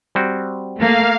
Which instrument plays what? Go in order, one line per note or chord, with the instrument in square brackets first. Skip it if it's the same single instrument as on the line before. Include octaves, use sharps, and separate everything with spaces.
[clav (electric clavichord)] G3 C4 F#4
[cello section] A3 A#3 [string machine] F5